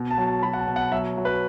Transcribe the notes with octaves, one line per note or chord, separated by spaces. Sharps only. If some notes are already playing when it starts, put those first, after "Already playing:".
Already playing: B2
A5
F#3
A5
F#3 B5
F#5
A5
B2
F#5
F#3 E5
F#3
B4